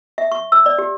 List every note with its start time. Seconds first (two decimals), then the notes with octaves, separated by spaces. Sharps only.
0.18 E5
0.32 C#6
0.52 E6
0.66 D5
0.78 G4